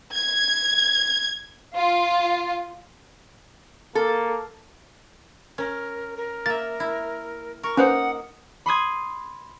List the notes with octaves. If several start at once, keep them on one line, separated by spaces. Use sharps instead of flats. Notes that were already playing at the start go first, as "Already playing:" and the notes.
G#6
F4
A#3 A4
C#4 A#4
A#4
A#3 E5 A6
E4
A#4 C#6
A#3 C#4 D#4 B4 C5 F#5
B5 C6 D#6 G#6